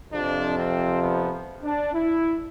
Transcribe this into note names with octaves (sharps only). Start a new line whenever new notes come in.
F2 C3 F3 D4
C4
B3
D4
E4